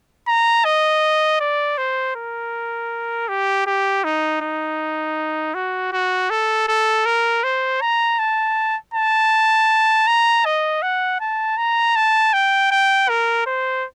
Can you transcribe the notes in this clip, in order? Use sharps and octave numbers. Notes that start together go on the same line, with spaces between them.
A#5
D#5
D5
C5
A#4
G4
G4
D#4
D#4
F#4
F#4
A4
A4
A#4
C5
A#5
A5
A5
A#5
D#5
F#5
A5
A#5
A5
G5
G5
A#4
C5